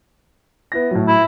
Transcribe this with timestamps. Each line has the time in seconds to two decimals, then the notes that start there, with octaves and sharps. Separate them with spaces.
0.72 B3 E4 A#6
0.91 A2 F#3
1.08 E4